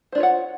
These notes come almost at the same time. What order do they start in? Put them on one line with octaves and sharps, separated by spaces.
C5 D4 F4 C#5 F#5